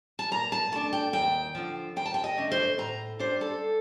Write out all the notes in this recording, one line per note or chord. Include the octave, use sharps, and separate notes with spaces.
A5
A#2 A#5
A5
A3 D4 A5
G5
D#2 G5
D3 F3
D#2 G5
A5
G5
D#5
D3 A3 D4
C5
A2 A#5
G3 D4 C5
A4